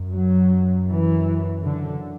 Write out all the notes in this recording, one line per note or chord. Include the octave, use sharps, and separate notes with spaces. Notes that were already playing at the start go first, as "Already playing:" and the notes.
Already playing: F#2
F#3
E3
D3